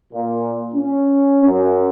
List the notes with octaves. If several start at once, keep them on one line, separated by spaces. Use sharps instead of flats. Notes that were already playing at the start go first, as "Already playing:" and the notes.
A#2
C#4
F#2